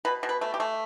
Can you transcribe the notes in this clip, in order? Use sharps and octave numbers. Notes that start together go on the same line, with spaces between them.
B2 B4
B2
B4
A3
G4
A3